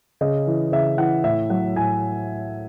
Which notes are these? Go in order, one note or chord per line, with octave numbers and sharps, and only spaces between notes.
C#3 D#5
E3
C#3 E5
E3 F#5
A2 E5
F#3 F#5
A2 G#5